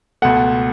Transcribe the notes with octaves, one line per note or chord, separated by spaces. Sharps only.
C#2 B2 A3 F#5